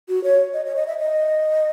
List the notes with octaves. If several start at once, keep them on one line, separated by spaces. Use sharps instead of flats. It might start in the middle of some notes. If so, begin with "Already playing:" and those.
F#4
C#5
D#5
C#5
D#5
E5
D#5